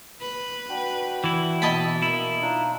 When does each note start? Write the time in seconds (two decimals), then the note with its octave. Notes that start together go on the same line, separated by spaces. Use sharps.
0.21 B4
0.69 D4 F#4 G5
1.24 E3 E4
1.62 B2 D#5 A5 B5
2.02 A#3 E4
2.41 D4 D#4 F4